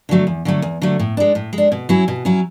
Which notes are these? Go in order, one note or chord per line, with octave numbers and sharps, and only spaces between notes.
D3 F#3 A3
E2
D3 F#3 A3
E2
D3 F#3 A3
A2
G#3 D4
A2
G#3
D4
B2
F#3 C#4 E4
B2
F#3 C#4 E4